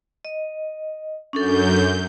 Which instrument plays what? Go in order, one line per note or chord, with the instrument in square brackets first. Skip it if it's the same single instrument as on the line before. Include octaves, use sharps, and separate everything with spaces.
[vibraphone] D#5
[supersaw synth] F#2 G6 [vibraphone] C#4 D4 A4